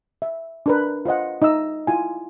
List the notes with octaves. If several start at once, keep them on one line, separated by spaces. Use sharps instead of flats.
E5
D4 A#4 B4
F4 C5 D#5 F#5
D#4 D#5 E5 E6
E4 F4 G#5